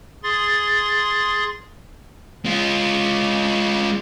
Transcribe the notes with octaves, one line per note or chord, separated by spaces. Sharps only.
G#4 C6 A6
G#3 F4